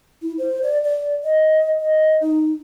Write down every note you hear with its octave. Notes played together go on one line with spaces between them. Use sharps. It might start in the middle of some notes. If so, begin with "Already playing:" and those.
E4
C5
D5
D5
D#5
D#5
D#4